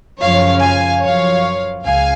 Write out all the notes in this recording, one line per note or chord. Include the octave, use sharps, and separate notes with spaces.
F#2 C#3 F3 C#5 F5
F5 G#5
F#2 F3 C#5 F5
C#2 F5 G#5